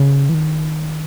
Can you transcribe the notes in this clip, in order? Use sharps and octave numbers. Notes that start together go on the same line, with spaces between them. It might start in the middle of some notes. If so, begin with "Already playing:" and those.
Already playing: C#3
E3
D#3